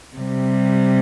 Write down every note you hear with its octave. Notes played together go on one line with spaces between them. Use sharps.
C3 G3